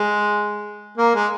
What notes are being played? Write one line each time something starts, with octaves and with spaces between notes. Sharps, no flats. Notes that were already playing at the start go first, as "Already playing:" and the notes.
Already playing: G#3
A#3
G#3